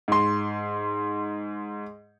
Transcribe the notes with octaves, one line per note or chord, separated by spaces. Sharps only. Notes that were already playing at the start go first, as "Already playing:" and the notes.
G#2 C6